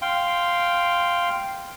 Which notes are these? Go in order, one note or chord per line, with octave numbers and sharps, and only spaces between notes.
F5 G5 C6